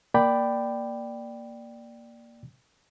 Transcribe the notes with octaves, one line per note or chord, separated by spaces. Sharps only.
A#3 D5 G5 B5